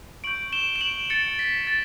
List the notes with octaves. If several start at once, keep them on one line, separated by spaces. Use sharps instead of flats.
C#6 G6 D7 F#7
E7 G7
E7
D7 F#7
A6 C#7
B6
A6